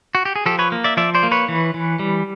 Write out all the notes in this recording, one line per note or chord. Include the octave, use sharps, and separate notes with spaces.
F#4
G4
G#4
F3 G4 A4
B4 C#5
A#3
D5 E5
F3 D5 E5
C5 D5
A#3
B4 C#5
E3
E3
G3